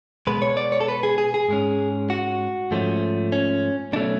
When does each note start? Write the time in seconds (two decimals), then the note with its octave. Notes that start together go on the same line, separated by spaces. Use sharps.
0.27 B2 G#3 B3 B4
0.42 C#5
0.57 D5
0.72 C#5
0.81 A4
0.88 B4
1.03 G#4
1.18 G#4
1.34 G#4
1.49 G#2 G#3 C#4
2.10 F#4
2.71 G#2 F3 A3 C#4
3.32 C#4
3.93 B2 F#3 A3 C#4 D4